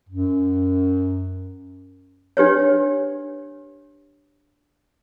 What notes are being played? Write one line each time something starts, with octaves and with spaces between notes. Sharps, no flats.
F#2
D4 G4 B4 C#5